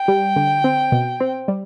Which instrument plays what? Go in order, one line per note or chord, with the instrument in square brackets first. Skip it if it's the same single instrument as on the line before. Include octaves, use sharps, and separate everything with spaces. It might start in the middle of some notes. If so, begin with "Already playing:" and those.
Already playing: [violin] G5
[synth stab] G3
D3
C4
B2
C4
G3